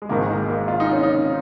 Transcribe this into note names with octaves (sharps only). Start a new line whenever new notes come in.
G#3
G#1 G#2 D#3 A#3
G#3
A#3
F4
D#4
C#4
D#4